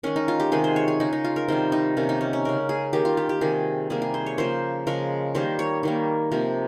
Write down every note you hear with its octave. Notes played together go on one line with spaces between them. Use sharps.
D#3 G#3 C#4
D#4
F4
G4
C3 D#3 G#3 G#4
C5
C#5
G#4
C#3 G#3 D#4
D#4
F4
A#4
C3 D#3 G3 C5
D#4
C3 D#3 A#3 C#4
D#4
C#4
C#4
C#3 G#3 A#4
G#4
D#3 A#3 G4
F4
G4
G4
C3 D#3 G3 G#4
C3 G3 A#3 G#4
G#4
C5
C#5
C#3 F3 A#3 C5
C#3 F3 G#3 A#4
D#3 G3 A#3 C5
C#5
D#3 G3 A#3
C3 F3 A#3